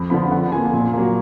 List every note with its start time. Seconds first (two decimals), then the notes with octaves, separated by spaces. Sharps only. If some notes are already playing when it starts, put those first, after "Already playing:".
Already playing: F2 B5
0.10 D3 F3 B3 B5
0.31 F2 F#5
0.52 F3 A#3 G#5
0.73 A#2
0.93 F#3 A#3